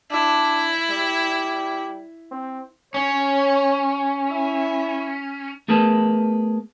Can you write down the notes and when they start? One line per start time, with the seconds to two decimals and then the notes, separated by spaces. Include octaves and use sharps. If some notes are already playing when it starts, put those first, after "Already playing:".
0.11 D4 E4
0.90 G3
2.31 C4
2.94 C#4 C#5
4.30 E4 E5
5.68 A3 B3 G#4 A#4 B4 A5